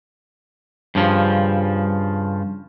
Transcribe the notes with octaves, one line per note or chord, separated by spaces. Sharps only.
G2 C#3 F3